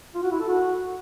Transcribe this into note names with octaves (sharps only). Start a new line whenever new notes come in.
F4
F#4
E4
A4
F#4